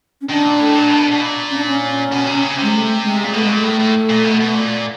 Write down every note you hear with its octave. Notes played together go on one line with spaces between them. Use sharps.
C#4
D#3 D4
A#2
A2
A#2
B2
B2
A#2
C#4
D4
C#4
B2
C3
C#3
C3 G#3
A3
G#3
A#2
B2 A3
A#2 G#3
A3
A2
A2
A#2
B2
B2
A#2